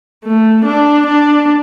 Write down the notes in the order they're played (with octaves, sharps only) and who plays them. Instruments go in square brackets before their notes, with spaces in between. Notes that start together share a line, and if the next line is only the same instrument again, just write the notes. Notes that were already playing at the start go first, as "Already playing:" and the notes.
[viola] A3
D4
D4